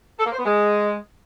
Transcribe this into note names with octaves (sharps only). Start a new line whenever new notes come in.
A4
A#3
C5
B3
G#3